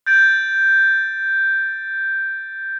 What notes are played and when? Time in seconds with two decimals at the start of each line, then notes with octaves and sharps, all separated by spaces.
0.06 G6 A6 D7